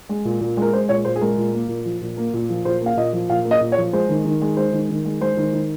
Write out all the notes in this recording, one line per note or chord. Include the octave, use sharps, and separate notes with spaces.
G#3
A#2
A#2
G#3 A#4
G#3 C5
A#2 C#5
A#2 C5
G#4
G#3 A#4
A#2
A#3
A#2
F3
A#2
A#3
A#2
F3
A#2 C5
A#3 F5
A#2 D#5
F3
A#2 F5
A#3
D#5
A#2
C#5
F3
G#3 C5
D#3
D#3
G#3
G#3 C5
D#3
D#3
G#3
G#3 C5
D#3
D#3